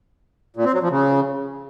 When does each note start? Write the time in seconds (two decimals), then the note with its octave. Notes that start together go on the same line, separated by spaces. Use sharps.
0.57 A#2
0.65 C4
0.74 F#3
0.82 F3
0.91 C#3